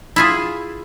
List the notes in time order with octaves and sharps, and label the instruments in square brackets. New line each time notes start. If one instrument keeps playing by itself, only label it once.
[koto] E4 F4 G#4